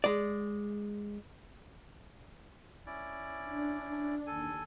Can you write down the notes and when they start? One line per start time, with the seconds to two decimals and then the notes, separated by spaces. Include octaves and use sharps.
0.04 G#3 D5
2.86 C#4 E4 D5
3.41 D4
4.27 D#2 A4 G#5